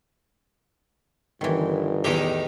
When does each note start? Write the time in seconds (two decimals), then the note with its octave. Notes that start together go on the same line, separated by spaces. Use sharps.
1.41 G1 D#3 E3
2.04 E2 A2 D#3 G4